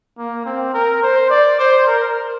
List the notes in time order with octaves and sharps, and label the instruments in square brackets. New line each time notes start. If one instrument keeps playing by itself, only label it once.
[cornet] A#3
C4
A#4
C5
D5
C5
A#4